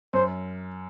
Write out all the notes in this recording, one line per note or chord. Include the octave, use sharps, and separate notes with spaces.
F#2 C5